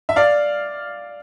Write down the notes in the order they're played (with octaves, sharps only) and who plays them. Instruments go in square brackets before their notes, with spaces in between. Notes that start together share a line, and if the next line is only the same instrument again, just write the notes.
[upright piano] E5
D5 F5